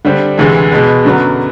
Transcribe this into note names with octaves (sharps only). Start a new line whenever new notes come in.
D3 G3 C4
D2 C3 E3 G#3
B2 G#3 B3
F#2 D3 F#3 B3